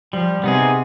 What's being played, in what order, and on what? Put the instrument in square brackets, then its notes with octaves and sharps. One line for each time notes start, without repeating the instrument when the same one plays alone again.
[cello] F3 [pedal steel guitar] G3
[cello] C3 [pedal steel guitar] B3 D#4 G#4